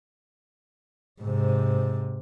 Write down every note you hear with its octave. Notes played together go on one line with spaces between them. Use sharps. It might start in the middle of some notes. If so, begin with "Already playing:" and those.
G#2 C3